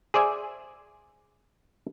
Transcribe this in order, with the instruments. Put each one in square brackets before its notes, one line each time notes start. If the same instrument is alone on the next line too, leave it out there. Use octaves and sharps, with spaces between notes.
[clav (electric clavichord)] G#4 C5 D5 E5 G#5